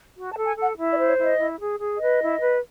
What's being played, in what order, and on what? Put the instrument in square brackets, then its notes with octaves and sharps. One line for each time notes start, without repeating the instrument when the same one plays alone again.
[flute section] F#4
A5
A4
G#5
A4
F#5
E4
D5
C5
C#5
E4
D#5
E4
G#4
G#4
B4 D#5
E4
B4